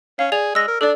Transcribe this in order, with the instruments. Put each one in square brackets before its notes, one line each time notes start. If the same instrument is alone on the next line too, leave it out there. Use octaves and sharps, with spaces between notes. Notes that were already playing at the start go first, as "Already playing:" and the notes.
[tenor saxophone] C#4 [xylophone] F5
[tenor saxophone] G#4 [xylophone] D5 F7
[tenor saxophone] G#3 [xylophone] E6 A#6
[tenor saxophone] A#4
[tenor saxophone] D4 [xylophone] A4 D5